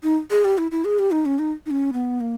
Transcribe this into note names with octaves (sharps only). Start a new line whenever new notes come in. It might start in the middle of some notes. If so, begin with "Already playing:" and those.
D#4
G#4
G4
E4
E4
G#4
G4
D#4
C#4
D#4
D#4
C#4
B3
A#3